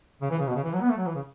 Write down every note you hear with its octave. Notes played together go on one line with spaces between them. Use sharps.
C#3
E3
C#3
B2
C#3
E3
F#3
B3
A3
F#3
E3
C#3